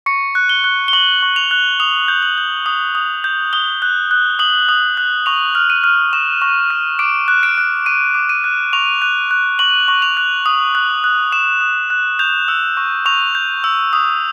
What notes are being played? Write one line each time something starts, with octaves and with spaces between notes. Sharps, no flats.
C#6 C#7
F#6
G7
F#6
G7
C#6 F#7
C#6
F7
F#6
D#6 F7
G6
F#7
G6
D#6
D#6
G6
D#6 G7
F#6
F#6
D#6 F#7
D#6
F#6
C#6 F7
F6
D#7
F6
C#6 E7
C#6
F6
D6 D7
F#6
D7
F#6
D6 D#7
D6
D#7
F#6
C#6 F7
F#6
F#6
C#6 F#7
C#6
F7
F#6
D#6
F#6
F#6
D#6 E7
D#6
F#6
G6 F7
E6
C#6
C#6 F7
G6
E6
D#6